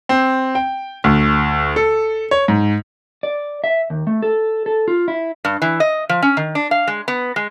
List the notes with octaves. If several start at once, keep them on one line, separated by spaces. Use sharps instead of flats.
C4
G5
D2
A4
C#5
G#2
D5
E5
D#2
A3
A4
A4
F4
E4
G2
E3
D#5
F3
C#4
D#3
D4
F5
G#3
B3
G#3